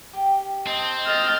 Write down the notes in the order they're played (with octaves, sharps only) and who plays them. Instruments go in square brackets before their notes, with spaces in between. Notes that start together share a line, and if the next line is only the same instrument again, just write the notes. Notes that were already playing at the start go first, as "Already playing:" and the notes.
[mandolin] G4
[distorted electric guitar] C4 [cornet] D#5 [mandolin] A5
[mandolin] A4 [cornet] D#5 [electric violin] F6 A6